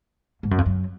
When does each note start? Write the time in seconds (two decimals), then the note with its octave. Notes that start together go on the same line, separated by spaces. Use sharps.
0.43 G#2
0.51 F#2
0.58 F2
0.66 F#2